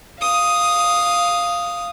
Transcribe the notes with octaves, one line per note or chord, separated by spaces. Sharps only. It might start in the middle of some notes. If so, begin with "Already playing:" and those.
F5 D#6